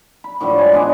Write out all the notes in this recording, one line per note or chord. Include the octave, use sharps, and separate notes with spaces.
B5
A2 D3 F3 G3
G#3 G#5
G#3 B3 D4 A4